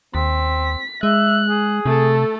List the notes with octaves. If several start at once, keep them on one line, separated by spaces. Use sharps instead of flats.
D#2 C4 B6
G#3 E5 F#6
G#4
C3 A3 A4